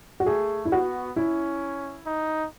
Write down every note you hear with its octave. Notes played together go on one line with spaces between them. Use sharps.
F#4
A3 G#4
E4
B3 F#4
C#4 E4
D#4